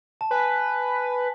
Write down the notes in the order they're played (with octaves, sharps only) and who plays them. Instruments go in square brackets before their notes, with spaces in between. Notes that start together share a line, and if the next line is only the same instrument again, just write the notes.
[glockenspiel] A5
[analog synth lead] B4 [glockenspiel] G#5